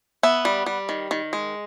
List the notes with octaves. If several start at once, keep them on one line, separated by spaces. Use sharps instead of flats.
B3 E5
G3
G3
D#3
D#3
G#3